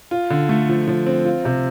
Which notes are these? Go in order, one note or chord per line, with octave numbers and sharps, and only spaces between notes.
F4
D3
A3
F3
F3
C4
F4
C3